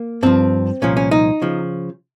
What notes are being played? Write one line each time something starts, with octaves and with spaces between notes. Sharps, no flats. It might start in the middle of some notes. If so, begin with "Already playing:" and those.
Already playing: A#3
G2 F3 C4
C2 A#2 F3 C#4
C#4
D#4
C#3 F3